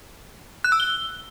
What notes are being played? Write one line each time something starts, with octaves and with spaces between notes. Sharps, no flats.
F#6
E6
G7